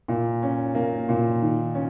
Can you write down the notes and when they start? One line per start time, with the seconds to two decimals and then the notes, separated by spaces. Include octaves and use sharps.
0.08 A#2
0.42 C#4
0.75 A#3
1.09 A#2
1.42 D#3
1.74 C#4